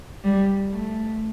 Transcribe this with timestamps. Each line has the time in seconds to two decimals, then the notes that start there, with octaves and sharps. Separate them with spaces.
0.24 G3
0.72 A3